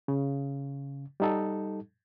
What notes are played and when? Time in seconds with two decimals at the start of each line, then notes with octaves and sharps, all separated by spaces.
0.08 C#3
1.20 G3 D#4 A4